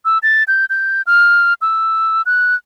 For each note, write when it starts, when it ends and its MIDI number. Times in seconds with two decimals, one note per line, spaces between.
0.05 0.18 88
0.23 0.44 93
0.48 0.65 91
0.70 1.02 91
1.07 1.54 89
1.62 2.22 88
2.26 2.55 90